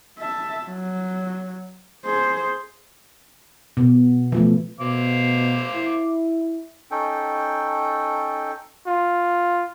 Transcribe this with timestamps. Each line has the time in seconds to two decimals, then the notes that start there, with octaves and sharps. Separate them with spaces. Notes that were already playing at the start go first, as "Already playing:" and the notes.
0.19 E5 A5
0.66 F#3
2.06 G#4 C5
3.77 B2
4.32 E3 F3 A3
4.80 B2 C5 F5 D6
5.75 E4
6.91 C#4 D#4 A4 G5
8.87 F4